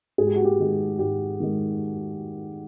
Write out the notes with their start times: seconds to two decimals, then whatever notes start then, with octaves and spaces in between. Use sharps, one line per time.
0.18 G#2 G#4
0.27 G4
0.36 F#4
0.45 G4
0.59 D#3 G#3
0.99 G#2 G4
1.40 D#3 G#3